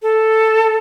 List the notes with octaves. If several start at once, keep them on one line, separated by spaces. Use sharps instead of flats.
A4